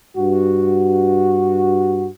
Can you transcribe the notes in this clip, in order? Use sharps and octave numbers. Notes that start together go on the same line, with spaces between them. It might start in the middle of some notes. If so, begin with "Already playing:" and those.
G2 F#4